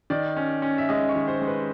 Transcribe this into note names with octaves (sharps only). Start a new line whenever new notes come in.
D#3 D5
C#4
C#4
E5
G#3 D#5
C#5
D#3
C5
G#3
B4